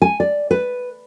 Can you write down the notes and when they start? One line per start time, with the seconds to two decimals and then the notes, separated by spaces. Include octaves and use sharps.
0.02 G#5
0.20 D5
0.51 B4